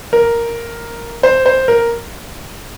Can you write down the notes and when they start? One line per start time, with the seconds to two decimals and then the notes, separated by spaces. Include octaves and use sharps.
0.13 A#4
1.23 C5
1.46 C5
1.68 A#4